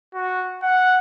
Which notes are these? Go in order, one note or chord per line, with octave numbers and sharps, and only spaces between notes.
F#4
F#5